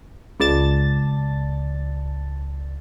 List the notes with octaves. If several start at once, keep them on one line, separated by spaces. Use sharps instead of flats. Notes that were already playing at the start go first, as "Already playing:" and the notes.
C#2 D5 A5 A6